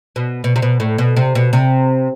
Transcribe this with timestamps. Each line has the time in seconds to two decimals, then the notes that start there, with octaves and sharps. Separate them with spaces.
0.16 B2
0.44 B2
0.56 C3
0.62 B2
0.80 A2
0.98 B2
1.16 C3
1.35 B2
1.53 C3